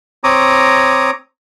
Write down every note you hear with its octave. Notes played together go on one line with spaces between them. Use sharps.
C4 C#5 A#5 D6 D#6